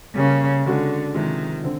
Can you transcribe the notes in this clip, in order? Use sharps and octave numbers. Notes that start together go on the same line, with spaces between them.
C#3 G3 A#3 C#4
D3 G#3 C#4 F#4 A4
C3 D#3 F3 G#3
D3 C4